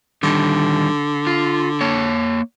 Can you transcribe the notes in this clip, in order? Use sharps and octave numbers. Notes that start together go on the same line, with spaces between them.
D3 D#3 G3
F4
A#3 C#5